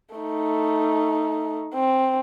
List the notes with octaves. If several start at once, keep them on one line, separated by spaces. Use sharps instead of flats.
A3 D#4
C4